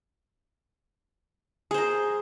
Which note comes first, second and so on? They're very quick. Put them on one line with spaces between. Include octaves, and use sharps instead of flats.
G#4 C5 A#4